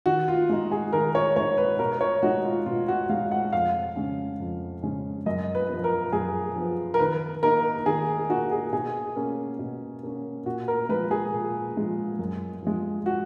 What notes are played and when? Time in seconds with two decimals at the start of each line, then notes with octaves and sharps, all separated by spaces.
0.06 D#3 F#4
0.28 F4
0.49 G#3 D#4
0.72 G#4
0.93 D#3 A#4
1.15 C#5
1.36 G#3 D#4 C#5
1.58 B4
1.79 B2 A#4
2.01 C#5
2.23 G#3 D#4 F#4
2.44 F4
2.66 B2 F4
2.88 F#4
3.09 G#3 D#4 F5
3.31 F#5
3.53 F2 F5
3.96 C#3 G#3 C#4
4.40 F2
4.83 C#3 G#3 C#4
5.26 F#2 D#5
5.55 B4
5.69 F3 B3
5.84 A#4
6.12 F#2 G#4
6.56 F3 B3
6.94 A#4
6.99 D#3 B4
7.43 A#3 D#4 A#4
7.86 D#3 G#4
8.29 A#3 D#4 F#4
8.51 G#4
8.72 B2 G#4
9.16 A#3 C#4
9.59 B2
10.03 A#3 C#4
10.46 A#2 F#4
10.68 A#4
10.89 F3 G#3 B4
11.11 G#4
11.33 A#2
11.76 F3 G#3
12.19 F#2
12.62 F3 G#3
13.06 F#4